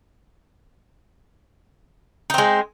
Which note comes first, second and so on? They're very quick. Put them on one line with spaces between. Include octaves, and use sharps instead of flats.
D#4 C4 G#3